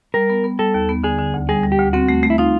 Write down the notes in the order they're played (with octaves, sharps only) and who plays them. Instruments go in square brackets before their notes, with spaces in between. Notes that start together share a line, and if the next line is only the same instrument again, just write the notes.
[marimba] G3 [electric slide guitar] A#4
[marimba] B3
B3
[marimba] G3 [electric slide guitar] A4
[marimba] D#2
B3
[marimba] D3 [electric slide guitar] G#4
[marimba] D3
D2
[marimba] G3 [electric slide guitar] G#4
[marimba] G3
[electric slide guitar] G4
[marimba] D2
[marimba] C4 [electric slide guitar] F#4
[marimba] A3
A3
[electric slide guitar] E4
[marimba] D#4 [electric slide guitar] F4